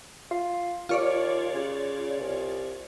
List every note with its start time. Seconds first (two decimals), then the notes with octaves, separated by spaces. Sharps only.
0.31 F4
0.89 D#2 F4 C#5 D5
1.54 C#3
2.20 C2